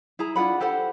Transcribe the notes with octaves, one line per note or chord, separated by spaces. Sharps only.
E4 G#4 A#5
D4 F4 F#5 B5
G4 A4 C5 F#5